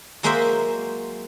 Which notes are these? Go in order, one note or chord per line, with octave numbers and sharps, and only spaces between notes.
F#3 G#3 A#3 F#4 C5 E5